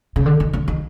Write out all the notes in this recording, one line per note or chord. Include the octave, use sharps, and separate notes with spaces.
C#3
D3
D#3
D3
D#3